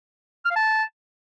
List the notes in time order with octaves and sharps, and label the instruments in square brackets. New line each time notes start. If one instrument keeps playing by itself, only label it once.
[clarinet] F6
F5
A5